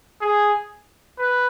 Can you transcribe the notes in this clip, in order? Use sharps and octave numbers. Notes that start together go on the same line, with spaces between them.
G#4
B4